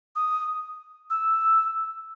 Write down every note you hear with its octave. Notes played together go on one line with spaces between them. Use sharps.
D#6
E6